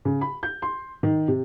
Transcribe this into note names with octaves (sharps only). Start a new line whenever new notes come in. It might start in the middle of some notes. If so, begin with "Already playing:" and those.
C#3
B5
G6
C6
D#3
C3